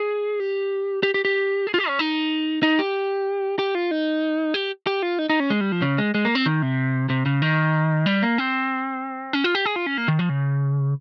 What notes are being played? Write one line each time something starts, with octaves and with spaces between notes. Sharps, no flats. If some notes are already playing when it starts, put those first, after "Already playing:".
Already playing: G#4
G4
G4
G4
G4
G#4
F4
G4
C#4
D#4
D#4
G4
G4
F4
D#4
G4
G4
F4
D#4
D#4
C#4
G#3
G3
F3
C#3
G#3
G#3
A#3
C4
D#3
C3
C3
C#3
D#3
G3
A#3
C4
C#4
F4
G4
G#4
F4
C#4
A#3
D#3
F3
C#3